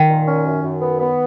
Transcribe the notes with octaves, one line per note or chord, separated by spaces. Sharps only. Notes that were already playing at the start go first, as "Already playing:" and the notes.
Already playing: D#3
A#2
C#4
F#2
F#2
B3
B3